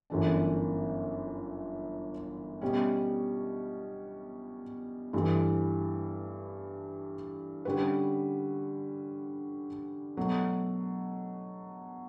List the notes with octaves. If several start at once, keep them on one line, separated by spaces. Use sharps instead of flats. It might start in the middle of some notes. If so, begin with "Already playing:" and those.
G1 F#2 E3 A3 D4
B2 G3 C#4
G2 E3 A3 E4
D3 G3 C#4 F#4 B4
B2 F#3 A3